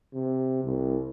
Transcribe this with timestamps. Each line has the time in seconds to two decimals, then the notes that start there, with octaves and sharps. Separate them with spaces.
0.14 C3
0.65 C2